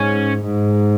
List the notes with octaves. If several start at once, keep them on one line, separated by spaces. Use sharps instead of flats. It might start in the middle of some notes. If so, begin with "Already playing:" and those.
Already playing: G#2 C#4
G#2